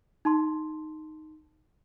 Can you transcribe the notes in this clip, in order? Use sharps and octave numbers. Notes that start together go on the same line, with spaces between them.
D#4 A5 C6